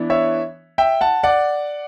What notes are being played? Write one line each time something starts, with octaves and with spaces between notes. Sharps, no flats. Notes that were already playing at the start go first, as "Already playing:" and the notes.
Already playing: E3 B3 D4
C#5 E5
E5 G5
F#5 A5
D5 F#5